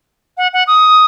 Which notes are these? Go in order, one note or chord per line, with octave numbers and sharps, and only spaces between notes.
F#5
F#5
D#6